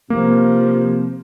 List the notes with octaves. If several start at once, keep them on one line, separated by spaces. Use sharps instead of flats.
C3 F3 A#3